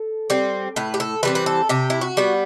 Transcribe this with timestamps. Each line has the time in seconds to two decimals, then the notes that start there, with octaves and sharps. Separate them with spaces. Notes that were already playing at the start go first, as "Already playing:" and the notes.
Already playing: A4
0.30 G3 C4
0.76 A2 B4
0.94 G4
1.00 A4
1.23 E3 G3 C4 B4
1.35 B4
1.46 A4
1.69 C3 G4
1.90 E4
2.01 F#4
2.17 G3 B3